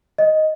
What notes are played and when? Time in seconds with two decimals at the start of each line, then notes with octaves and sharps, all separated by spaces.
0.18 D#5